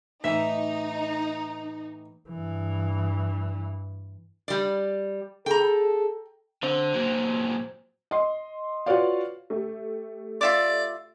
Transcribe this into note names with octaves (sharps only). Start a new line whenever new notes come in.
A2 E3 D#4 E5
G2 E3
G3 D5
G#4 A4 G5 A#5
D3 C4
A#2 F#3
D#5 C6
F4 F#4 B4 C#5 D5 F5
A3 G4
F4 D5 E5 D6